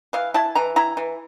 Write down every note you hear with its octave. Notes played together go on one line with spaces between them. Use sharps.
E3 F5
E4 A5
E3 A#5
E4 A#5
E3